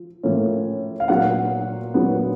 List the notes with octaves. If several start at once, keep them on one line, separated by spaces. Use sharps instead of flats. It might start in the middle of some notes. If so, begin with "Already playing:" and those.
Already playing: F3
A2 F3 A#3 C#4
F5
A#2 F#3 B3 F#5
A#2 F#3 B3